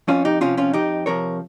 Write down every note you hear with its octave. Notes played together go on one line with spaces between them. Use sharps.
F2 C#4 F4
D#4 G4
C3 F3 C#4 F4
C#4 F4
F2 D#4 G4
C3 F3 A#4 C#5